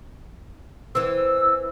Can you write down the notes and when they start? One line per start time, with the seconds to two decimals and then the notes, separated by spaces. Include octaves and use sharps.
0.95 E3 C4 E6